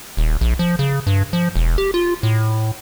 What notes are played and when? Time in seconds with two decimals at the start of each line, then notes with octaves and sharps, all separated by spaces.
0.17 D#1
0.41 A#1
0.59 F3
0.79 C#3
1.07 G2
1.33 F3
1.56 E1
1.78 G4
1.94 F4
2.23 A2